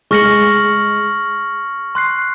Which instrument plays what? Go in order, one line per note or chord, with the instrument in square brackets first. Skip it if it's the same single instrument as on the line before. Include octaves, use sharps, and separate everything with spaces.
[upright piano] G#3 [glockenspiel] C#6 F6 A#6 C#7 F#7
[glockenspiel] C6 F#6 C7